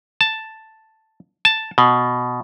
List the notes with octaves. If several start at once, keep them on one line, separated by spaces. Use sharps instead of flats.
A5
A5
B2